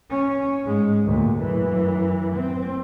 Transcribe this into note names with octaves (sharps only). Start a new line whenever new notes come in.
C#4
G#2 G#3
D2 A#2
F#2 E3
C4